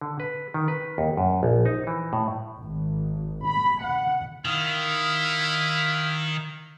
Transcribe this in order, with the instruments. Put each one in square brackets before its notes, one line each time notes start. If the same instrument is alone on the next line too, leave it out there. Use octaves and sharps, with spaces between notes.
[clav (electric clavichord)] D3
B4
D#3
B4
D#2
F#2
A#1
D#4
E3
A2
[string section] G#1
B5
F#5
[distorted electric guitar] D#3 [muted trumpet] E4 [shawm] F5